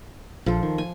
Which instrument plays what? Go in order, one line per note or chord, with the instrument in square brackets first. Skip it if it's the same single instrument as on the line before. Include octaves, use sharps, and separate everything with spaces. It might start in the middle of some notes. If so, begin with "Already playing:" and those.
[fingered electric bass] A#1 [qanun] F3 A4 C5
[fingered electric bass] D#3
[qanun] G#5